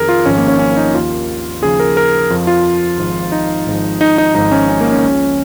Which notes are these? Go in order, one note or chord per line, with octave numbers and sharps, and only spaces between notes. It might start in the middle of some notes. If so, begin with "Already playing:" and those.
Already playing: F2 D#3 G#4 A#4
F4
G#1 G#2 F3 C#4
A#3
C#4
C#4
D#4
D#2 D#3 F4
D#2 C#3 F3 G#4
A#4
A#4
F2 F3
F4
G#1 G#2 F3
D#4
G#1 G#2 F3
D#4
D#4
G#1 G#2 F3 D#4
C#4
C#4
A#3
C#4
C#2 C#3 F3